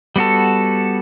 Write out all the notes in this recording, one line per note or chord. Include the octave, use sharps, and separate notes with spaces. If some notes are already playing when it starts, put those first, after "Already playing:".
G3 B3 F#4 A4